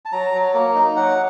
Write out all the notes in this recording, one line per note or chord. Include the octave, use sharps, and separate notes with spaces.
A5
F#3 A#5
F#3
A#3
D#4
F#3 F#5